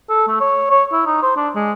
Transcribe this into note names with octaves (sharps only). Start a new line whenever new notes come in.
A4
A3
C#5
C#5
E4
D#4
C5
D4
G#3